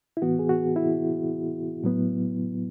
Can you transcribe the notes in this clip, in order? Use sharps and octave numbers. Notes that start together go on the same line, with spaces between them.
E4
A2 E3 B3 F#4
G#4
F#4
E4
A2 F#3 B3